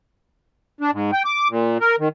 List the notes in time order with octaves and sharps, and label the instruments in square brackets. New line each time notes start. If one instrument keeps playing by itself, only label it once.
[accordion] D4
G#2
G5
D6
A#2
A#4
D#3